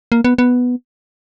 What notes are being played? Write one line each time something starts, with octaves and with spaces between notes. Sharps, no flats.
A#3
B3
B3